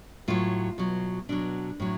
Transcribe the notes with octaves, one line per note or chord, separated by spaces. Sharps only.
A2 F#3 F4
B2 F#3
B2 F#3 D4
A2 F#3